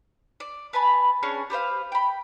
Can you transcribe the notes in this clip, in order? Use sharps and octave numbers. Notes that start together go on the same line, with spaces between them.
D5
B4 G#5 A5 B5
C#4 D4 G#4 C#5
G4 B4 C5 F5
G5 B5